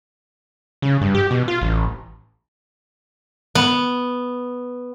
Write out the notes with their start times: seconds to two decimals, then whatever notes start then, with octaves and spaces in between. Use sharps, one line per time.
0.82 C#3
1.01 G2
1.15 G4
1.31 B2
1.48 F4
1.62 A1
3.55 B3